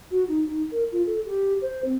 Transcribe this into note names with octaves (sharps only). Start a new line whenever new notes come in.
F#4
D#4
D#4
A#4
F4
A4
G4
C5
C4